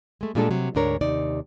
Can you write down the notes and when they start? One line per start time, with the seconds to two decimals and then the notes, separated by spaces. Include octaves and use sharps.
0.21 G#3 A3
0.35 A#2 G3 G#3 D4 G4 A4
0.51 C3 F#3
0.75 D2 G#2 D4 A#4 C#5
1.01 D#2 C3 D#4 D5